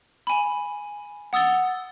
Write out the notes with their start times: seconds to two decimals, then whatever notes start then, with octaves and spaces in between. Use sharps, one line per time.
0.27 G#5 B5
1.33 F#5 D#6 E6 A6 G7